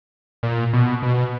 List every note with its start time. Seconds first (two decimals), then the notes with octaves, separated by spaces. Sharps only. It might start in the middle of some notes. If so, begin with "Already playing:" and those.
0.43 A#2
0.73 B2
1.03 B2